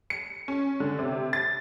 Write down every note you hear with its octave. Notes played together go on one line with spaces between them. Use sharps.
C#7
C#4
D3
C3
A6